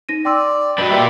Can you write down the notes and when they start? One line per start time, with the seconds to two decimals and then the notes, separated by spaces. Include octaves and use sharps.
0.09 D#4 A#6 D#7
0.25 D5 G5 C6 E6
0.78 D4 F#4 B4 D#5 G5 F#7
0.91 G3 A#3 F4 G4 D5 E5